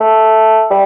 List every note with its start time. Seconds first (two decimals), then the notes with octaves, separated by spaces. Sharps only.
0.01 A3
0.70 G3